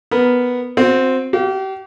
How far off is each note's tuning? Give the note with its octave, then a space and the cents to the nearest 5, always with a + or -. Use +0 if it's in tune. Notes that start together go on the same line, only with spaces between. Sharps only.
B3 +0 A#4 +0
C4 +0 F#4 -35
G4 -35 F5 +0